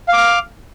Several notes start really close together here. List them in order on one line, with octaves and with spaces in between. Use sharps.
F5 D6 F6